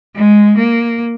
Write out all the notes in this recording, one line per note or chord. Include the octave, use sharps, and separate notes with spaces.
G#3
A#3